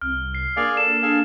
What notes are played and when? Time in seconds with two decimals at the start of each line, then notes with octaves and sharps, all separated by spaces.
0.01 C2 F6
0.34 C7
0.57 A#3 D4 G#4 D5 F5
0.77 A4 E7
1.02 G#4 A4 F5